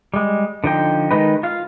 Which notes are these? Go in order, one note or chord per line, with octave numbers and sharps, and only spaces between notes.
G3 G#3
D3 F3 D#4 G5
D#3 G#3 D#4 B4
F4 F5